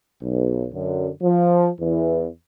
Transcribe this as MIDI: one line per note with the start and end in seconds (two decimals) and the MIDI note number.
0.22 0.68 35
0.73 1.10 42
0.73 1.10 50
1.23 1.69 53
1.80 2.27 40
1.80 2.27 52